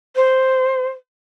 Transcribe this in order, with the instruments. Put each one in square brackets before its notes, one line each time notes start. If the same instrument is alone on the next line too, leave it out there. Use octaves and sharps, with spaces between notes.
[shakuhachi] C5